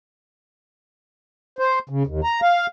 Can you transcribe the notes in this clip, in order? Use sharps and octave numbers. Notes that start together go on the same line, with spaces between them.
C5
C#3
D#2
A#5
F5